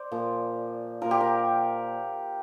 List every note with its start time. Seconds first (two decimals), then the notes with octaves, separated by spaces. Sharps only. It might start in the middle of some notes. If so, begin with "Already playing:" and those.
Already playing: C5 D5
0.12 A#2 F3
1.01 A#2 F3 A#4
1.11 G4
1.21 A#4